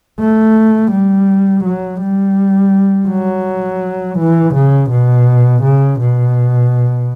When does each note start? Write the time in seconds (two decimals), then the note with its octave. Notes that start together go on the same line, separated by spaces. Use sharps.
0.19 A3
0.91 G3
1.64 F#3
2.01 G3
3.09 F#3
4.18 E3
4.54 C#3
4.90 B2
5.63 C#3
6.00 B2